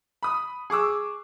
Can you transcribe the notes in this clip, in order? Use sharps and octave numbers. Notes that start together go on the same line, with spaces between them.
B5 D#6
G#4 C#6 D6 E6